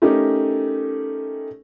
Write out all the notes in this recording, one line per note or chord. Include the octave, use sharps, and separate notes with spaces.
A3 C#4 D#4 G4 A#4